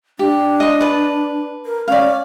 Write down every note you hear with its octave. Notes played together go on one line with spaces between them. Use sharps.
D4 G4
D#5 C6
B4 A5
A#4
C#4 D5 F5